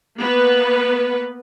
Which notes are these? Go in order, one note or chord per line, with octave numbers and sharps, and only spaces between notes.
A#3 B3 B4